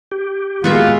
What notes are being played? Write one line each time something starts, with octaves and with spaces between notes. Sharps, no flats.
G4
D#3 G#3 A#3 B3 F4 F#4 E5